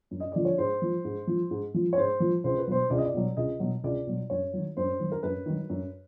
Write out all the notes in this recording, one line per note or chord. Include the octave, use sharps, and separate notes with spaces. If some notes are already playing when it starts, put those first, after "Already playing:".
F#2
D#5
D3 F3 D5
C#5
G#2 C5
F3
G#2
F3
G#2
F3
C#5
G#2 C5
F3
C#2 C5
B4
B2 F#3 C5
C#2 D5
D#5
D5
B2 F#3
C#2 D#5
B2 F#3
C#2 D5
B2 F#3
F#2 C#5
D#3 F#3
F#2 C5
D#3 F#3
A#4
F#2 B4
D#3 F#3
F#2